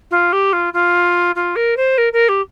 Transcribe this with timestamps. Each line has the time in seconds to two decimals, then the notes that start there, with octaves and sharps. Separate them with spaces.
0.11 F4
0.33 G4
0.53 F4
0.73 F4
1.35 F4
1.56 A#4
1.77 C5
1.98 A#4
2.13 A#4
2.29 G4